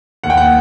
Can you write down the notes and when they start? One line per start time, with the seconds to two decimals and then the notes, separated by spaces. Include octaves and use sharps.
0.24 D#2 F#5
0.30 G5
0.37 F#5